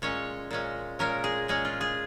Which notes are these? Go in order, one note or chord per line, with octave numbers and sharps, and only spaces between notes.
A#2 G#3 C#4 C#5
A#2 G#3 C#4
A#2 G#3 C#4 A#4
G#4
A#2 G#3 C#4 G#4
F4
G#4